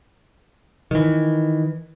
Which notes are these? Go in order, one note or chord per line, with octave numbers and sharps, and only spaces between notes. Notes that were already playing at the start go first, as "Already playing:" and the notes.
D#3 E3